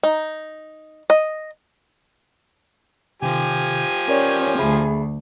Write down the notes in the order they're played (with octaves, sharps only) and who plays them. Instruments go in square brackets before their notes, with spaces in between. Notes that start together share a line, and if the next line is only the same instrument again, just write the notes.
[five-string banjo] D#4
D#5
[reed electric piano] C3 D#3 [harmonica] F3 G4 G#5
[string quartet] C#4 [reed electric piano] A#4 C#5 D5
[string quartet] D2 [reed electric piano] G#4 E5 B5